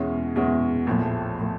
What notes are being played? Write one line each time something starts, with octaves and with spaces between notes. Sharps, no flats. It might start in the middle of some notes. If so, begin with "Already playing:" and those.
Already playing: E2 B2 G#3 C#4 E4
E2 B2 G#3 C#4 E4
A#1 A2 F3 A3
A2 F3 A3